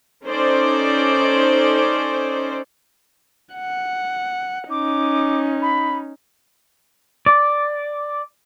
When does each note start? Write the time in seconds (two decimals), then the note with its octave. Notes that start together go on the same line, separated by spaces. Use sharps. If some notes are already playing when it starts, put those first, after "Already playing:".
0.25 C#4 D#4 A4 C5 D5
3.54 F#5
4.70 C#4 D#4 D6
5.62 B5
7.26 D5